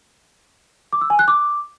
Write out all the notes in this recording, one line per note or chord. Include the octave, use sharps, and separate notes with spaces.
D6
E6
G#5
F#6
D6